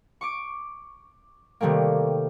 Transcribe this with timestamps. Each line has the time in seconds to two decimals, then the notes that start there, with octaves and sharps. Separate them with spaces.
0.21 C#6 D6 D7
1.60 C3 D#3 G3 A3 A#3